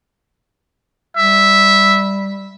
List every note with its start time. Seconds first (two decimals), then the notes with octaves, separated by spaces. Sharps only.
1.17 G3 E5